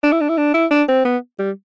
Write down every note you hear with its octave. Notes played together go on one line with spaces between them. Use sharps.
D4
E4
D4
E4
D4
E4
D4
C4
B3
G3